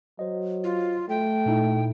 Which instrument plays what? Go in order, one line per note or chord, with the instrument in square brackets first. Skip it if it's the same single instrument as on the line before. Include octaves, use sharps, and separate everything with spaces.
[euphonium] F#3 [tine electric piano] C5 D#5
[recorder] F4
[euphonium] A3 [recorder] G5
[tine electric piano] A#2 D#4 E4